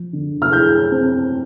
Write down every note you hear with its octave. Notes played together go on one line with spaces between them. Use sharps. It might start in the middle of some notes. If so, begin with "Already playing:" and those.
Already playing: F3
D3
F6
E4 G6
C4